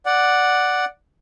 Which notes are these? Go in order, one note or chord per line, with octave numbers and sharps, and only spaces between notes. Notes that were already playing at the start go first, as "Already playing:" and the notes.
D5 F#5